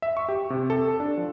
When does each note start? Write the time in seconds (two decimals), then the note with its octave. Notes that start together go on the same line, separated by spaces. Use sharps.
0.02 E5
0.17 C#6
0.29 G4
0.50 C3
0.70 A4
1.00 D4
1.17 F3